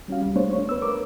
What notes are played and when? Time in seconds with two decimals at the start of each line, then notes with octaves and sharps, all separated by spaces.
0.08 G3 C#4 F#4 F5
0.21 C#2 G3
0.35 G3 A3 B3 D4 C5 C#5
0.53 C#5
0.69 B4 E6
0.82 A#4 B4 D6